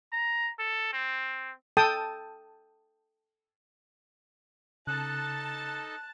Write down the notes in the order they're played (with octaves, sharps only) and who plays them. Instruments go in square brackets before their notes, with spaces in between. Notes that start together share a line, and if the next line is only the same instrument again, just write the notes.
[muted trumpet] A#5
A4
C4
[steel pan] A4 G5 A5 D#6
[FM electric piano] C#3 [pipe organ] D#4 A4 [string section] A5 [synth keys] F#6